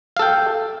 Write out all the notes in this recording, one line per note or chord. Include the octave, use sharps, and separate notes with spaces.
A4 F5 G5